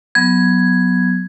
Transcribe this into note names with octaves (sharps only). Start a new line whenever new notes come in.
F#3 B3 G#6